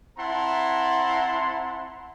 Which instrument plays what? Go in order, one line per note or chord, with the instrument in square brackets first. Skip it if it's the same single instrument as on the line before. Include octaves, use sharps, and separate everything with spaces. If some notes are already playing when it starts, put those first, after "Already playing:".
[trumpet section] C4 E4 F#5 A5 A#5 C6